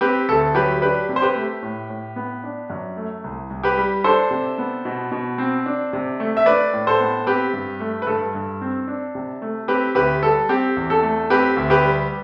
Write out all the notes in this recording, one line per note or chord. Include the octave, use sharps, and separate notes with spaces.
C4 G4 B4
D2 A4
F#3 G4 B4
D4 G4 B4
C3
C5
G4 B4
A3
A2
A2
B3
D4
F#2
A3
C2
C2
G4 B4
G3
D4 A4 C5
C3
B3
B2
B2
C4
D4
C3
A3
E5
D4 B4 D5
A2
A4 C5
B3
C4 G4 B4
G2
A3
B4
G2 A4
G2
C4
D4
C3
A3
C4 G4 B4
D2 G4 B4
G3 A4
C4 G4
E2
A4
A3
C4 G4 B4
D2
G4 B4
G3